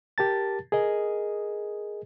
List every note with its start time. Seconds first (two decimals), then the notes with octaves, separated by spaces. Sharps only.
0.18 G4 A#4 A5 A6
0.72 G#4 A#4 D#5